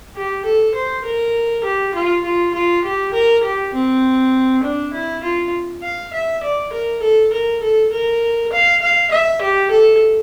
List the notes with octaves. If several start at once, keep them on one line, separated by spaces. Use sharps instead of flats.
G4
A4
C5
A#4
G4
F4
F4
F4
G4
A#4
G4
C4
D4
E4
F4
F5
E5
D5
A#4
A4
A#4
A4
A#4
F5
F5
E5
G4
A4